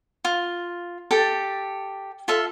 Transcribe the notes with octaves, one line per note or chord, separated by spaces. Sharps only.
F4
G4 A4 A5
F4 A4 E5